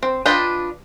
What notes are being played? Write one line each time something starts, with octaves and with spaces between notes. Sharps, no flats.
C4
D4 F4 B4 D#5 G5